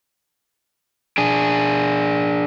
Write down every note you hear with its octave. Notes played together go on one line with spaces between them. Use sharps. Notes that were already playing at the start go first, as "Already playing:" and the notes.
D4 G#4